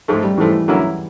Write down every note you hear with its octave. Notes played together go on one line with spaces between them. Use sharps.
G#2 F3 G#3 A3
G3
G#2 E3 F3 A3
D3 F#3 A#3 C#4 E4